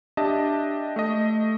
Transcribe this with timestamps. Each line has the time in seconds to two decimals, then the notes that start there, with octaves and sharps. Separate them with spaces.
0.17 D4 G4 D#5 E5 A5
0.96 A3 D#5